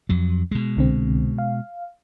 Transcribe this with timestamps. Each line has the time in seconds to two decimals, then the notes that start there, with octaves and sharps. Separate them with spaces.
0.09 F2 F#3
0.51 B2 G#3
0.77 C2 D3 C4
1.38 F5